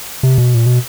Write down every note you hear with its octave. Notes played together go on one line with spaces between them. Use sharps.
C3
B2
A#2
B2